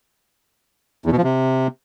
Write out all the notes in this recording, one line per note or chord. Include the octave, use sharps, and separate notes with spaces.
E2
B2
F3
C3